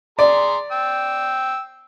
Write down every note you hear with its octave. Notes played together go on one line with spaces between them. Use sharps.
G#4 D5 A#5 C6
G5 E6